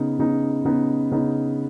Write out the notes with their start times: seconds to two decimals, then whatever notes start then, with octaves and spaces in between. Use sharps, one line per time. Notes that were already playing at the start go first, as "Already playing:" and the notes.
Already playing: C#3 B3 D#4
0.19 C#3 B3 D#4
0.65 C#3 B3 D#4
1.11 C#3 B3 D#4